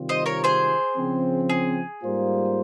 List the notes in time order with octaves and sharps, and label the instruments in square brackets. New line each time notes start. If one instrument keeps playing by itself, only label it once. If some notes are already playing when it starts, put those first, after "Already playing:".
Already playing: [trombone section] C3 D#3 G3 C4 F4
[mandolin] C5 D#5
A#4 C#5
G#4 C5
[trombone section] C#3 F3 C4
[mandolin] G#4
[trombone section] G#2 G3 A#3 F4 C5